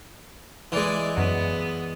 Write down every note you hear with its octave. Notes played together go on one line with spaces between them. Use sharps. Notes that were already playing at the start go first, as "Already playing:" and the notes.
E3 G#3 D5
F#2 F#3 B3